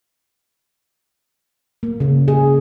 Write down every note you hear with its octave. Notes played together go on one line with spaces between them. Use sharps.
A#3
C#3
G#4